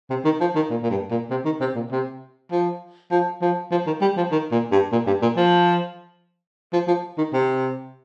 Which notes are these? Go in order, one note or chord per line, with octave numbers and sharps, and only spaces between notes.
C3
D#3
F3
D#3
A#2
A#2
G2
A#2
C3
D#3
C3
A#2
C3
F3
F3
F3
F3
D#3
G3
F3
D#3
A#2
G2
A#2
G2
A#2
F3
F3
F3
D#3
C3